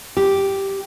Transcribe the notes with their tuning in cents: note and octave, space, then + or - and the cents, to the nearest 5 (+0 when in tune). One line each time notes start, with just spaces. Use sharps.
G4 -5